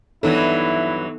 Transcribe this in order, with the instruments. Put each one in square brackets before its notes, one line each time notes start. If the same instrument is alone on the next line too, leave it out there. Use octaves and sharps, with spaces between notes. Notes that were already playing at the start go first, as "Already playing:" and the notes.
[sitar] G2 E3 F#3 [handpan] B3 D#4 A4 [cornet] E4